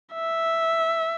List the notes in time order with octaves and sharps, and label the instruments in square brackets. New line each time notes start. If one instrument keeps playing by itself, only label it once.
[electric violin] E5